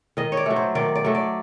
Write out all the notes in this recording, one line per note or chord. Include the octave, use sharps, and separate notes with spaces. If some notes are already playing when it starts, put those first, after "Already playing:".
D#3 D#5
C#5
D5
F#3 A3
C5
D#3 D5
D5
F#3 A3
D5